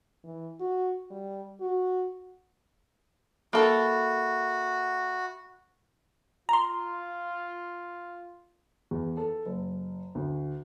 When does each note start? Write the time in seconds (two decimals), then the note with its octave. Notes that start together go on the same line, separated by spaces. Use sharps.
0.24 E3
0.60 F#4
1.10 G3
1.61 F#4
3.53 A#3 F#4 A4 E5 B5
6.49 F4 A#5 C6
8.91 E2
9.17 A4
9.46 F#1
10.15 D2